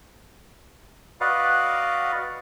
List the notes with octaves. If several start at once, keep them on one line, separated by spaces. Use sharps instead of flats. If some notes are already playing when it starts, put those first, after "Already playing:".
F#4 B4 D5 D#5 F5 F#5